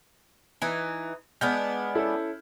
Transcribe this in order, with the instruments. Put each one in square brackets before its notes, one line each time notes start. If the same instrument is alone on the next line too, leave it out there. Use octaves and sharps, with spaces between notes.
[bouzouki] E3 D#4
[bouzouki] G#3 B3 D4 [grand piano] F6 G6
[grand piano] C#4 E4 A4